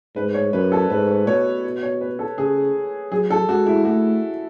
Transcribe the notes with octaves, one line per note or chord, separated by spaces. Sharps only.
G#2 B4
C#5
F#2 B4
A4
G#2 B4
B2 C#5
C#5
B4
A4
C#3 G#4
F#3 G#4
A4
G#3 F#4
E4
A3 F#4